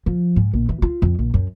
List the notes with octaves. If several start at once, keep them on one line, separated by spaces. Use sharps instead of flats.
F3
G#2
A#1
E3
F4
F2
A#1
F#2